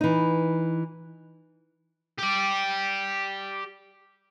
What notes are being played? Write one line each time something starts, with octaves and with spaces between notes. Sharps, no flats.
E3 D#4
G4 D5